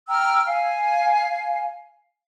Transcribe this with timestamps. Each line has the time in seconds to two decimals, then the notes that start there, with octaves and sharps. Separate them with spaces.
0.09 G5 A#5 E6 F6
0.47 F5 G#5